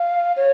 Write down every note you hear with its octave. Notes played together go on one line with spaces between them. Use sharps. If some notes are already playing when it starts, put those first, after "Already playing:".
Already playing: F5
C#5